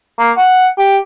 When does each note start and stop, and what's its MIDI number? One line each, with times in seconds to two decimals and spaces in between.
0.19 0.32 58
0.37 0.68 78
0.78 0.98 67